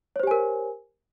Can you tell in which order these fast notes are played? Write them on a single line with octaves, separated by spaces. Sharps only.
C#5 C5 G4 G#5 A#4